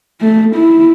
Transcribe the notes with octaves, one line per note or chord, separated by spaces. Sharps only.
A3
E4